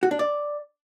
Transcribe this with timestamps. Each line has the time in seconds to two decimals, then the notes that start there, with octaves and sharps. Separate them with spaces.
0.03 F#4
0.11 D4
0.19 D5